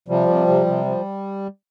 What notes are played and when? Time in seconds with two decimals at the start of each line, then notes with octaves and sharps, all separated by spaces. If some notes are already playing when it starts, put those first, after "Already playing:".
0.08 C3 F3 G3
0.28 C3
0.48 C3
0.66 C3
0.85 F3